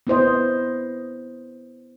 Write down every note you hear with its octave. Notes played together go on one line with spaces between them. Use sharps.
B3 E4 C5 D#5